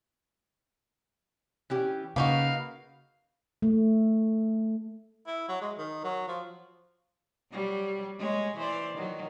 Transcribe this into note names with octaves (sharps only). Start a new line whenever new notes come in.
E3 C#4 G4
C#3 A#3 D#4 F#4 B4 F5
A3
E4
F#3
G#3
D#3
F#3
F3
F#3 G3
G#3 C#5
E3 C5 D5
D#3 F#3